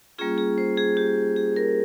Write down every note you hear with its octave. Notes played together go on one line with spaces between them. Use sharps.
G3 A#3 C#4 F4 G#4
G#4
C5
G#4
G4
G#4
A#4